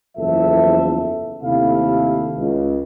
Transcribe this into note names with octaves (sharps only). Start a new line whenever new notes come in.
F#1 E2 F3 A4 E5
D#2 C3 A3 E4 A4 F5
C#2